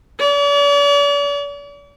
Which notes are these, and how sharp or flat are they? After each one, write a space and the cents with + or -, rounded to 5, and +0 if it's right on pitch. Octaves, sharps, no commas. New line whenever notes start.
D5 -45